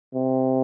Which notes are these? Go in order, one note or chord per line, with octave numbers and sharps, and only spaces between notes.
C3